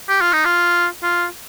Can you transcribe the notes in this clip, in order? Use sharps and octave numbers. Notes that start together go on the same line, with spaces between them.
G4
F4
D#4
F4
F4